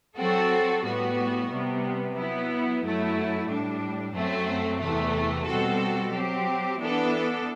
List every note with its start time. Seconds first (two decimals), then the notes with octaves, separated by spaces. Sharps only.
0.17 F#3 C4 F#4 A4
0.83 A2 G3 B3 F#4
1.49 C3 G3 B3
2.15 F#3 B3 E4
2.81 F#2 F#3 A3 E4
3.47 A2 G3 D4
4.13 F#2 F#3 A3 C4
4.80 E2 C3 E3 A3
5.46 B2 G3 C4 F#4 A4
6.12 F#3 C4 G4
6.79 E3 B3 D4 A4